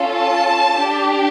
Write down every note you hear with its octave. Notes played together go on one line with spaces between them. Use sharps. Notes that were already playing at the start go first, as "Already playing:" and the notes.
Already playing: C#4 F4 A4
A5
D4 G4